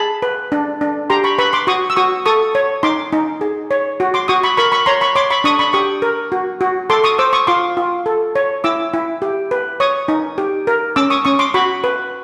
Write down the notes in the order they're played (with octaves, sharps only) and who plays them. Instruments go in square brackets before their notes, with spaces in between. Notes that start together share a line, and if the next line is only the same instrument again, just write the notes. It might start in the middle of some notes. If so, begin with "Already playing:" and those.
Already playing: [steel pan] G#4 A5 B5
B4
D4
D4
G4 A#5 C6
B5 C#6
B4 B5 C#6
C6 D6
F#4 C#6 D#6
E6
F#4 C#6 D#6
A4 C#6 D#6
C#5
D#4 C6 D6
D#4
G#4
C#5
F#4
C6 D6
F#4 C#6 D#6
B5 C#6
A#4 B5 C#6
B5 C#6
C#5 A#5 C6
B5 C#6
C#5 C6 D6
B5 C#6
D4 C#6 D#6
B5 C#6
G4 C#6 D#6
A#4
F#4
F#4
A4 C6 D6
C#6 D#6
C5 D6 E6
C#6 D#6
F4 C6 D6
F4
A4
C#5
E4 D6 E6
E4
G4
B4
C#5 C#6 D#6
D#4
G4
A#4
C#4 D6 E6
C#6 D#6
C#4 C#6 D#6
C6 D6
F#4 B5 C#6
B4